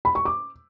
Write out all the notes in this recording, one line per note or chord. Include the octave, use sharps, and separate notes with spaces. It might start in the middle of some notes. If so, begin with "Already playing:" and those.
B5
C#6
D6